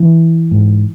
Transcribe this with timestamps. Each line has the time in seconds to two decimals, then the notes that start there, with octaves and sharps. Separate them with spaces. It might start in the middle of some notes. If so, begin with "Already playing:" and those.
Already playing: E3
0.51 G#2